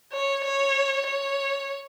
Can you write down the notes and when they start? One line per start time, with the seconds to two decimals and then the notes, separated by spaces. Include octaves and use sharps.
0.12 C#5
0.45 C#5
1.07 C#5